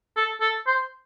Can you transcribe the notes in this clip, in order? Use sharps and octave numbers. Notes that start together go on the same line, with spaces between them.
A4
A4
C5